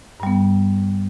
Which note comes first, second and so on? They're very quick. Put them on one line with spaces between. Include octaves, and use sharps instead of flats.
G2 G3 B3